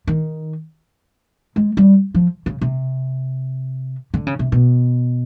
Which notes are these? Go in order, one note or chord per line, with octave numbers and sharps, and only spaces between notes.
D#3
G#3
G3
F3
C#3
C3
D3
C#3
C3
B2